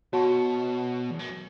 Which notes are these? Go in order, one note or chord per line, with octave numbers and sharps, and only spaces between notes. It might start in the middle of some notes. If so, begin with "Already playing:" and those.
B2 F#4 C#5 F#5 A5 C#6
E2
F#2